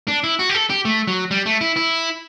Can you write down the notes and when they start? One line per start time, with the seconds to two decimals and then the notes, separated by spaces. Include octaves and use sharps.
0.08 D4
0.24 E4
0.39 F#4
0.49 G4
0.54 A4
0.70 G4
0.85 A3
1.08 F#3
1.31 G3
1.46 A3
1.61 E4
1.77 E4